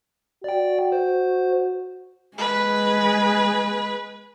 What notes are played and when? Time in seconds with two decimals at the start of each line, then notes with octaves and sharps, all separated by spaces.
0.44 F#4 D5 G5
0.92 C5
2.38 G#3 B4